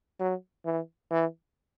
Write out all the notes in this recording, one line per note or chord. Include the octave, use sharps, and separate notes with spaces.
F#3
E3
E3